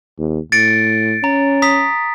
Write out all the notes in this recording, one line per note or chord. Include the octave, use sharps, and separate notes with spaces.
D#2
A2 A6 C#7 D7
C#4 A#5
A#5 D#6 B6